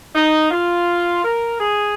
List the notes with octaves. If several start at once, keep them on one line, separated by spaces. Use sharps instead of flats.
D#4
F4
A#4
G#4